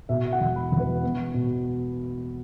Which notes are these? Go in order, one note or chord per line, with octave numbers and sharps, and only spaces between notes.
B2 E5
F#5
E1
B5
E1
B4
B3
B2